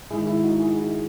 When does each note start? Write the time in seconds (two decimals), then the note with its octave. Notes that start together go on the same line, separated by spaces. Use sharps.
0.10 G#2 D#3 G#3 E4 G#4
0.27 E4
0.44 D#4 F#4
0.60 E4 G#4
0.76 E4